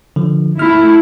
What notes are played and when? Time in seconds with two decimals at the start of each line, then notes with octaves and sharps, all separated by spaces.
0.16 D3 F3
0.59 A3 E4 F6